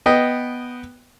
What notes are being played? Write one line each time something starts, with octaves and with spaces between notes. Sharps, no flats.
B3 D#5 G5